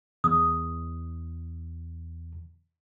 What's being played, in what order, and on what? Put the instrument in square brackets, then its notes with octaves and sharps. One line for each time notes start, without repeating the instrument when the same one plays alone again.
[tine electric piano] E2 [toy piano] D#6